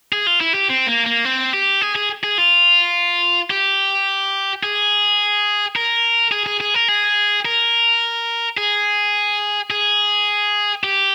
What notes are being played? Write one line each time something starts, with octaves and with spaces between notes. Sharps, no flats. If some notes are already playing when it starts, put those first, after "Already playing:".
G#4
F4
E4
G4
C4
A#3
A#3
C4
G4
G#4
G#4
G#4
F4
G4
G#4
A#4
G#4
G#4
G#4
A#4
G#4
A#4
G#4
G#4
G4